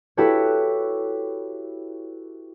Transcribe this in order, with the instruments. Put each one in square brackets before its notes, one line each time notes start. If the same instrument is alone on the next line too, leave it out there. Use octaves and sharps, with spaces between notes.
[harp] E4 F#4 G4 A4 B4 C#5